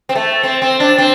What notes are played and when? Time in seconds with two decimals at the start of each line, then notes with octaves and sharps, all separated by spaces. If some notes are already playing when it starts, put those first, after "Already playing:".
0.09 C4
0.15 A3
0.43 C4
0.62 C4
0.80 D4
0.98 C4